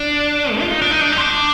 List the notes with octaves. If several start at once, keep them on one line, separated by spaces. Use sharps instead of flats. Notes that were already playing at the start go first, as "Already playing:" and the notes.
Already playing: D4
G#3
F4
D#4
D4
D#4
D4
D#4
C4
D4